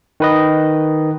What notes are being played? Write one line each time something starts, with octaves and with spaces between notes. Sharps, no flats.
D#3 B4 D#5